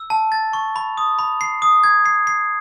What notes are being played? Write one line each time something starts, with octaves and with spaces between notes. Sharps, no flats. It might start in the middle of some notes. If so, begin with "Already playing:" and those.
Already playing: E6
A5
A6
C#6
B5
D#6
B5
C7
D#6
G#6
C7
C7